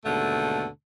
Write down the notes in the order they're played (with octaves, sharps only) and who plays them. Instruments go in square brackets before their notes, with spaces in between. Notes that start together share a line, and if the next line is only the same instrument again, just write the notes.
[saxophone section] D#2 G#2 B2 D3 A3